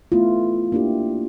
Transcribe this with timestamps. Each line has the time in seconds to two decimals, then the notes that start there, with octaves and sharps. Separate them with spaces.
0.12 A3 B3 E4 F4
0.72 A#3 D4 E4 G4